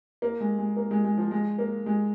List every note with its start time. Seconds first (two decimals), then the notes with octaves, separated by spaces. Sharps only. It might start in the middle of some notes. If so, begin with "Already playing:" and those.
0.22 A#3
0.41 G#3
0.58 G#3
0.76 A#3
0.91 G#3
1.04 G#3
1.17 F3
1.31 G#3
1.58 A#3
1.86 G#3